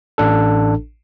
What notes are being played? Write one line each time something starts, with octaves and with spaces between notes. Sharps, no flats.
A1 D4 A4